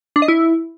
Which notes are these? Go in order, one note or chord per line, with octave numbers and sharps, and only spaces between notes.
D4
D#5
E4